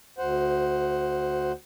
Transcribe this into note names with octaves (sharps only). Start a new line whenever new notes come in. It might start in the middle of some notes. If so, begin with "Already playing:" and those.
D2 C5 F#5